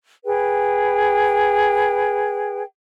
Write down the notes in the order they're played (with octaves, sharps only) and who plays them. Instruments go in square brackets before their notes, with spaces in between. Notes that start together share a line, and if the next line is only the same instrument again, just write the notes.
[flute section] G#4 B4 G5